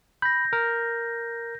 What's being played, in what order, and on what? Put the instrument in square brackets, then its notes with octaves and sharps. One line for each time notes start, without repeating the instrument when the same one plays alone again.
[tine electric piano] B5 [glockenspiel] G6 A#6
[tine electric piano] A#4